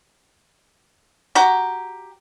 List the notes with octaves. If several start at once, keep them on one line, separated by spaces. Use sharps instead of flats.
F#4 G4 A#5